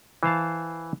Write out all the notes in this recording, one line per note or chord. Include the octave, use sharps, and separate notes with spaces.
E3 C5 F5 A5